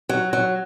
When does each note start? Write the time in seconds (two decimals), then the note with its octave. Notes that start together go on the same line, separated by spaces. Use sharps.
0.09 F#3
0.33 F#3